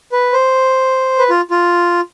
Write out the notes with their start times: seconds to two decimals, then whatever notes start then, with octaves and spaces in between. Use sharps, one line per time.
0.12 B4
0.33 C5
1.19 B4
1.30 F4
1.51 F4